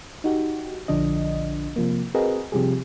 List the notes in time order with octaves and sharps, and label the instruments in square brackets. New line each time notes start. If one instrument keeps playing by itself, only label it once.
[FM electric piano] D#4 F#4 G4
A#1 D3 F3 D4 D#5
C3 F3 A#3
C4 F#4 G#4 A#4 B4 D#5
C3 F3 G3 G4 G#4